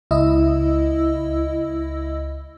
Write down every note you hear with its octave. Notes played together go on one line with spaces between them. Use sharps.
C#2 E4 D#5 E6